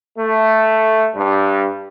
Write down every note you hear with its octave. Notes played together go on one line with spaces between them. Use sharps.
A3
G2